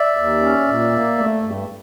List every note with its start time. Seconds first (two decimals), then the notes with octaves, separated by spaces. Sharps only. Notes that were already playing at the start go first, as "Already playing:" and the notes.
Already playing: D5 E5
0.17 D#2
0.42 C#4
0.68 A#2
0.92 A#3
1.18 A3
1.42 G2